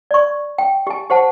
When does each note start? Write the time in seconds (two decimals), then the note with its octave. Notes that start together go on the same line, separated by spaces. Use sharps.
0.11 D5 C#6
0.58 G5
0.87 G4 G#5
1.10 G4 C5 F#5 A5